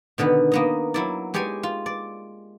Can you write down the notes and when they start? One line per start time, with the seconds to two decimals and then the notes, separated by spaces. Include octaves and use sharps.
0.18 B2 D3 D#3 B3
0.52 A#3 B3 D#5
0.94 F#3 E4 D5
1.34 G#3 G4 C#5 D5 G#5
1.63 F4
1.86 D5